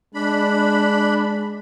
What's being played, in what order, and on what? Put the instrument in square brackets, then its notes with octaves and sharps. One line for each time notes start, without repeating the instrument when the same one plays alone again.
[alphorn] G#3 [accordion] D4 B5